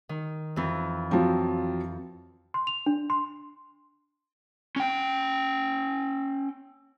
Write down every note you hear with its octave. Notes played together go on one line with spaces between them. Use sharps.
D#3
F2 E3
F3 F#3 C4
C6
F7
D4
C6
C#4 G5